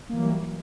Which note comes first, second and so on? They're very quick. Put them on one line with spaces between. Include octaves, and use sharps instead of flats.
A#3 E3 F#3 G3